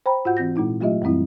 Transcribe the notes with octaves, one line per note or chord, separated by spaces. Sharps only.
C5 G5 A#5 B5
G#2 F4 F#4 F#5 G6
E3 C4 G6 A#6
A#2 G#3 D#4 E4
F#3 A3 F4 G4 D#5 E5
F#2 E3 G3 C4 E4